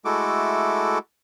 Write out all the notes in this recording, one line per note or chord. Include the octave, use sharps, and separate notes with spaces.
G#3 A3 E4 F#4 A4 D6